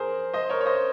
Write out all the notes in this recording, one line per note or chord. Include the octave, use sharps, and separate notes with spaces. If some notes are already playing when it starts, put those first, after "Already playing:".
Already playing: G#4 A#4 C5
C5 D#5
A#4 C#5
C#5
C5 D#5